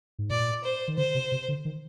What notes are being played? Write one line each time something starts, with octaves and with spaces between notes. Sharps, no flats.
G#2
A#2 D5
C5
D#3
D3 C5
C3
C3
D3
D#3